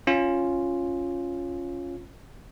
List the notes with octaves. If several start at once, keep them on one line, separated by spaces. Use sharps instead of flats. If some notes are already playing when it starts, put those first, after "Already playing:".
C#4 F4